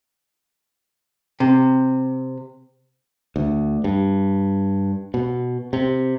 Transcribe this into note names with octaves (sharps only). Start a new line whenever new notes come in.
C3
D2
G2
B2
C3